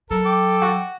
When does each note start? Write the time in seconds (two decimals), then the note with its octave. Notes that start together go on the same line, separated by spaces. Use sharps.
0.11 F#3 A4 A#4
0.26 G5 D6
0.62 F#4